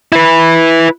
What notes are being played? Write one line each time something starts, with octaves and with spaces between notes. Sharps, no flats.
E4 B4